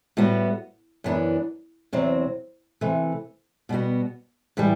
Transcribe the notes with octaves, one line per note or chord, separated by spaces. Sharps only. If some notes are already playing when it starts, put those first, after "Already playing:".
A2 G3 B3 F#4
F#2 E3 B3 D4
E2 C3 F#3 C4
C3 E3 A3
B2 G3 B3 F#4
A2 E3 G3